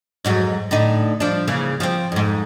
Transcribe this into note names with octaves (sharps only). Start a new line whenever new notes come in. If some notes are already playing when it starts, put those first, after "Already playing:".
F2 G#2 F#3
A2 D3 D#4
F3 D4
C#3 E3 A#3
F3 C4
F2 G#2